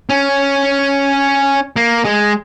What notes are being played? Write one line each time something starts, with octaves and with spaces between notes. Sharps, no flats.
C#4
A#3
G#3